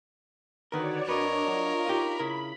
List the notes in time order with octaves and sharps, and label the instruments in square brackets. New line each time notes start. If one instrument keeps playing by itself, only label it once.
[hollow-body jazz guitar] D3 D#3 A#4 [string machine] F#4 C#5 D5 [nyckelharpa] B4
[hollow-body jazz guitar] F2 B4 [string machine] D4 [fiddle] A#4 [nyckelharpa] C#5 D#5
[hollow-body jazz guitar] F#3 [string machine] F4
[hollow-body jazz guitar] D#4 G4 [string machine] B5
[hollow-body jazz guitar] C#3 E4 A#4